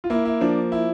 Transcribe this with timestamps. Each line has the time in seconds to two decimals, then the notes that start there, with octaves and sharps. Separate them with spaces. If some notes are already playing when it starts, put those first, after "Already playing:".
0.04 F4
0.10 A#3 E4
0.25 E4
0.41 F3 D4
0.72 E4